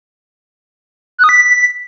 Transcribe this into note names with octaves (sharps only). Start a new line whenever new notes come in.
F#6
D#6
B6